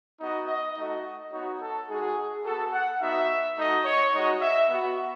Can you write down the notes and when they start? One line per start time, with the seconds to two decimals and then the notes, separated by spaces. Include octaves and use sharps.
0.20 B3 D#4 F#4 D#5
0.48 D#5
0.76 A3 D#4 F#4 D#5
1.32 B3 D#4 F#4 C#5
1.61 A4
1.88 G#3 D#4 F#4 G#4
2.44 B3 F#4 A4
2.72 F#5
3.01 B3 D#4 F#4 E5
3.57 A3 D#4 F#4 D#5
3.85 C#5
4.13 G#3 D#4 F#4 D#5
4.41 E5
4.70 B3 F#4